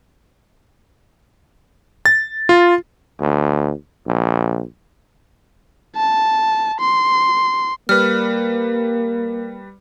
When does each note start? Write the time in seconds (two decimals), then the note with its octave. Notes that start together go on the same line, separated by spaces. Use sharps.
2.06 A6
2.49 F4
3.20 D2
4.07 A#1
5.96 A5
6.80 C6
7.89 G3 A#3 B4 F6